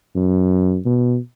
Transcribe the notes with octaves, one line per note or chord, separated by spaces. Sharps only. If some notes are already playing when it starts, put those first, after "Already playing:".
F#2
B2